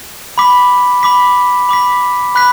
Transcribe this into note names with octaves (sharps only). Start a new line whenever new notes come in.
B5 D6 B6
B5 D6 B6
B5 D6 B6
B5 F#6 B6